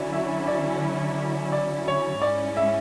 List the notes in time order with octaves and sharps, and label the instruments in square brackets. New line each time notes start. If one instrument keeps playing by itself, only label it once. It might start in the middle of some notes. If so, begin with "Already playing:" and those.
Already playing: [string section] D3 F#3 C#4 E4 [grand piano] C#5 D5
[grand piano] E5
D5
D5
C#5
[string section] G#2 G#3 C#4 E4 [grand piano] D5
[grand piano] E5